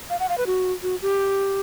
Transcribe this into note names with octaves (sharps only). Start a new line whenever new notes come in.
F5
F#5
F5
B4
F#4
F#4
G4